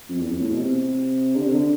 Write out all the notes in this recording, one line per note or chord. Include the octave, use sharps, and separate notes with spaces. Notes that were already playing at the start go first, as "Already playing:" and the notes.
F2
E2
F2
A2
B2
C3
D3
C3
D3